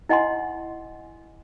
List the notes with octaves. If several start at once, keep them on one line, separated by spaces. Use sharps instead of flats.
E4 D#5 F#5 G#5 C6